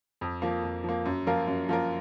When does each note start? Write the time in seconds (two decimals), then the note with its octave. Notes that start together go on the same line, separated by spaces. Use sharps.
0.21 F2
0.42 F3 A#3
0.63 F2
0.84 F3 A#3
1.05 F#2
1.27 F3 A#3 F4 A#4
1.47 F#2
1.69 F3 A#3 F4 A#4